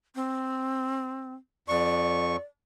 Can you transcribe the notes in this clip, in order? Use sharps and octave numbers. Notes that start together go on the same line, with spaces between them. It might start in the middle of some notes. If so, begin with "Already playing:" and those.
C4
F2 D5 C#6